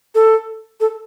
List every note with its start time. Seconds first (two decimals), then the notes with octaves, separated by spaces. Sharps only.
0.15 A4
0.80 A4